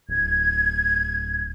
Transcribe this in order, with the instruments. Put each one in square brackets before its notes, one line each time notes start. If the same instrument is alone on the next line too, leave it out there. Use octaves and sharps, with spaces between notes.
[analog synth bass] D1 [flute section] G#6